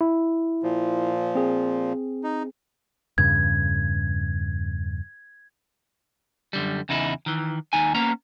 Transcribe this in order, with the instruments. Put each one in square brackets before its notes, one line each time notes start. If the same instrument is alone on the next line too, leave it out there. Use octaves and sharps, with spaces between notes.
[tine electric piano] E4
[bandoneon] A#2 F3
[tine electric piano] C4 G#4
[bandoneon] D#4
[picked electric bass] E2 G2 C#3 [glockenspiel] G#6
[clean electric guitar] F#2 D3 G3
E2 C#3 D#4 E4
D#3 E3
D#2 D#4 G#5
A#3 B3 C#4 A#5